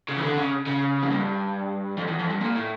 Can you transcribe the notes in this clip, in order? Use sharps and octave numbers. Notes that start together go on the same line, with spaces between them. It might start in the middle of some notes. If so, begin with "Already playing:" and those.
C#3
E3
D3
C#3
C#3
F2
G2
F2
E2
F2
G2
A#2
A2